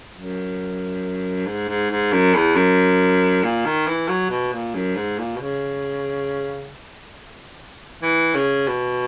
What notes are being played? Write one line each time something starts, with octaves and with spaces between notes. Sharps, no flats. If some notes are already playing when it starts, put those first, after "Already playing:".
F#2
G#2
G#2
G#2
F#2
E2
F#2
A#2
D#3
E3
F#3
B2
A#2
F#2
G#2
A#2
B2
C#3
E3
C#3
B2